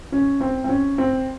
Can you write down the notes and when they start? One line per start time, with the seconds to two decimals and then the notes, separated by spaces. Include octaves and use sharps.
0.12 C#4
0.41 C4
0.64 C4
0.69 C#4
0.98 C4